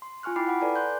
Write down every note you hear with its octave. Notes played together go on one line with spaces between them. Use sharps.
C6
F4 G#5 C#6 F6 F#6
E4 G5 B5 D6 F6 C7
F#5 B5 D6
A4 B4 D5 G#5 A#5 D6
C6 F#6 G6